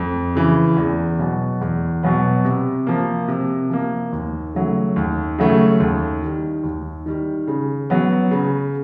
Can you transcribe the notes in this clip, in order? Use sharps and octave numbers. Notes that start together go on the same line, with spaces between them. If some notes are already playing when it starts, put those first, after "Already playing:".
Already playing: F2
C#3 E3
E2
B2 F#3 B3
E2
B2 F#3 B3
C3
F3 A#3
C3
F3 A#3
D#2
C#3 F#3 A3
D#2
C#3 F#3 A3
D#2
D#3 G3
D#2
D#3 G3
C#3
F#3 B3
C#3